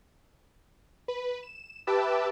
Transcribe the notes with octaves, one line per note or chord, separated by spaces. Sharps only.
B4
E7
G4 B4 E5 A5 D6 E6